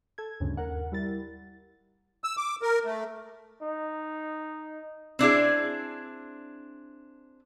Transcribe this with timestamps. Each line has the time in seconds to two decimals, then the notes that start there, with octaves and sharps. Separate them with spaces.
0.18 A4 G#6
0.40 D2 G2 C#3
0.57 D#2 A#4 F#5
0.92 G3 E4 A#4 A6
2.24 E6
2.37 D6
2.62 A#4
2.85 A3
3.62 D#4
5.19 C4 D4 E4 G#4